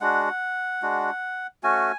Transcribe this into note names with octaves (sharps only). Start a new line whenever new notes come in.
G#3 D4 F#4 F#5
G#3 D4 F#4
A3 C#4 F#4 G#5